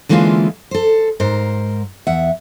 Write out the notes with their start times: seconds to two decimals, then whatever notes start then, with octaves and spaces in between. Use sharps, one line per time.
0.09 D3 E3 G#3 A#3 C#4 F4
0.71 A4 C5
1.20 G#2 A#4 C5
2.07 E2 E5 F#5